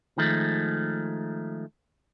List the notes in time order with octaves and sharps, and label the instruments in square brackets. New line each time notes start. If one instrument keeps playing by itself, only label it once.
[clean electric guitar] D#3 F3 G#3 A3